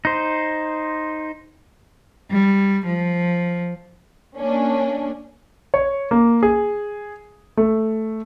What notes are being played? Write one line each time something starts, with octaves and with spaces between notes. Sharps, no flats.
D#4 C5
G3
F3
A#3 C#4 D4
C#5
A#3
G#4
A3